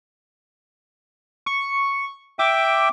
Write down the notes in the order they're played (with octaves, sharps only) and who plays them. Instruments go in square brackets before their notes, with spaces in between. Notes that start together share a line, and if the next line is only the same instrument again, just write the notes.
[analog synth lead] C#6
[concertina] E5 G5 [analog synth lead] D6